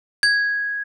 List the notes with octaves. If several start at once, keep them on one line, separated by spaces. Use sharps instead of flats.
G#6